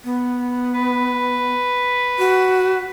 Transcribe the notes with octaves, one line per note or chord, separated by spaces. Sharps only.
B3
B4
F#4